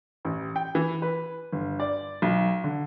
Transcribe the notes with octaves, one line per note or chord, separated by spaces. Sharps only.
A1
G5
E3
B4
G1
D5
B1
D3